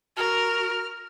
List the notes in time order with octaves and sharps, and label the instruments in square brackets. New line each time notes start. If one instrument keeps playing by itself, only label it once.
[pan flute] F#4 [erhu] A#4 [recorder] F6